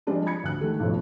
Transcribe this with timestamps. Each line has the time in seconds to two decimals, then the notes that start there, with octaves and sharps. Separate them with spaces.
0.07 F3 G3 G#3 C4 D4 F4
0.26 B5 G#6 C#7
0.44 D2 F#6
0.61 D#3 G#3 A3
0.80 B1 F2 A2 F3 A3